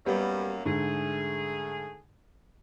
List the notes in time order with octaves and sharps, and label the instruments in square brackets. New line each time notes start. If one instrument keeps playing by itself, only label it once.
[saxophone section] F#2 A#3 [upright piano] G3 B3 G4
[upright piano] G#2 D3 [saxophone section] A3 G#4